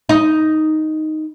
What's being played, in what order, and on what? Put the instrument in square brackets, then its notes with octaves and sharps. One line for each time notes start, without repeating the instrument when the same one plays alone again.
[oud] D#4